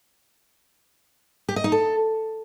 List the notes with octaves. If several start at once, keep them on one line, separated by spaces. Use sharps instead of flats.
G4
D#5
D#4
A4